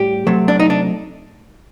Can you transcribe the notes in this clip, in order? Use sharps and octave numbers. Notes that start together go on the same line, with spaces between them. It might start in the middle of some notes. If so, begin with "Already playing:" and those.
Already playing: A2 G3 G4
C3 F#3 A3 C4
D4
D#4
D4